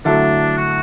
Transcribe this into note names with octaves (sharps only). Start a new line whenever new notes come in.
D3 F#3 A3 D4 E4 A4
F#4